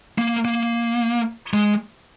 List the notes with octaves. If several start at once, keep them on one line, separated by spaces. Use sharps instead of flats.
A#3
A#3
G#3